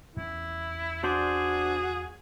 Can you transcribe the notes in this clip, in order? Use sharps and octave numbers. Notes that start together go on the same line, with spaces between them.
E2 A#3 C#4 E4
D4 F#4 G#4 C5 D5